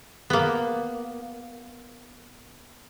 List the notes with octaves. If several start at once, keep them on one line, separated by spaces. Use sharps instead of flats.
A#3 B3